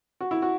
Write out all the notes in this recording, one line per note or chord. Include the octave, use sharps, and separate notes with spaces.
F#4
E4
F#4